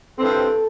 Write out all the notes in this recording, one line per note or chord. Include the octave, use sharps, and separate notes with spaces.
G2 E3 C4 A4